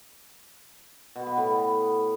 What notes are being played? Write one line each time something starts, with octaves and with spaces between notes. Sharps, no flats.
B2
B3
A2